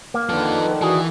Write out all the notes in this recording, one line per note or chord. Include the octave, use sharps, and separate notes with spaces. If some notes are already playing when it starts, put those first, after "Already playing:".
A#3
D3 D#3 F3 A4 B4
E3 F#4 G#4